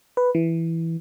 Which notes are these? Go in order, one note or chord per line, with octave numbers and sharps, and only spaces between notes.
B4
E3